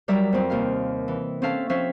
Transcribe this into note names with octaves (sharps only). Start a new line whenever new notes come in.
F#3 G3 A#4 D5 E5
F2 C4
D#2 C3 F5
E3
C4 C#4 A4 E5 F5 A5
F3 C4 C#4 E5 F5